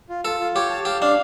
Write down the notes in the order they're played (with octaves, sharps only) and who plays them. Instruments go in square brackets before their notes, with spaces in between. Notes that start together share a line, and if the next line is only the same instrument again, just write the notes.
[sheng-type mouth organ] F4
[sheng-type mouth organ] F4 [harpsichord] A4
[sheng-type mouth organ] F4
[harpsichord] G4 [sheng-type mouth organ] C#5
[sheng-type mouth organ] A5
[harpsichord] G4 [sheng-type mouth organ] F5
[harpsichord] D4 [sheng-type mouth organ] F5